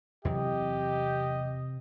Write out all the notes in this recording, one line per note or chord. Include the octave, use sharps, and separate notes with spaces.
E2 C3 E3 F#3 G4 D#5